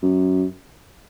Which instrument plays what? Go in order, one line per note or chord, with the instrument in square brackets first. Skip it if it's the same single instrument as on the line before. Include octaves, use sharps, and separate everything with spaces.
[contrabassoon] F#2